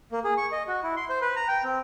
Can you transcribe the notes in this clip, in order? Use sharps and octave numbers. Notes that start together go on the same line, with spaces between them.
A#3
G#4
C#6
D#5
F#4
E4
C6
C5
B4
A#5
G5
C4